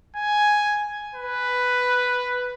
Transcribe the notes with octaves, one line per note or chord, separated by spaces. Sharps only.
G#5
B4